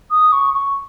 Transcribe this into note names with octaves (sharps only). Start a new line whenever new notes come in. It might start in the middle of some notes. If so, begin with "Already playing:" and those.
D#6
C#6
C#6